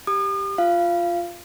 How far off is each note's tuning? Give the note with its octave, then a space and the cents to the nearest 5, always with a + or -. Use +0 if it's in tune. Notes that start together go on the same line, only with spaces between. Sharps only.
G4 +0 D#6 -40
F4 +0 F5 -20